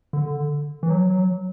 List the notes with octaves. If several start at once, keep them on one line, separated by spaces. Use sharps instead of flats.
D3
E3
F#3